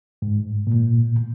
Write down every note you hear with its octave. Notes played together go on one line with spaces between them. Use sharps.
G#2
A#2